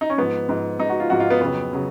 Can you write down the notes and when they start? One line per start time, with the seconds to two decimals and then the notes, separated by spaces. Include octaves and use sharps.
0.01 D#4
0.10 C#4
0.18 G#2 F3 B3
0.49 G#2 F3
0.79 G#2 F3 D#4
0.89 F#4
1.00 F4
1.10 G#2 F3 F#4
1.20 F4
1.30 B3
1.41 F2 C#3 F#3 B3
1.73 C#3 F#3